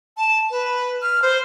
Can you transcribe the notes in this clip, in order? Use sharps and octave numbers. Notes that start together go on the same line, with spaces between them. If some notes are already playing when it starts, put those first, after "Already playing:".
A5
B4
F6
C5